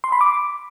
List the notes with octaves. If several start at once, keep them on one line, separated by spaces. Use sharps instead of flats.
C6
B5
D6